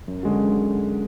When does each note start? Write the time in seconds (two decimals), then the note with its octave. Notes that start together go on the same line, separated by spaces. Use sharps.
0.08 F#2
0.23 D3 G#3 C#4 F#4